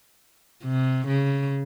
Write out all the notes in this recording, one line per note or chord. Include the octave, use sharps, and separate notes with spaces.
C3
C#3